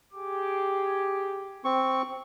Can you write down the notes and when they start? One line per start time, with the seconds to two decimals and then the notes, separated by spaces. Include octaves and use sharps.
0.13 G4 G#4 D6
1.65 C4 C#6